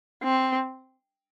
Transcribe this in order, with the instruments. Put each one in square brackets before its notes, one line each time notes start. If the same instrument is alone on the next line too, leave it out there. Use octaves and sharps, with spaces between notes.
[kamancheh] C4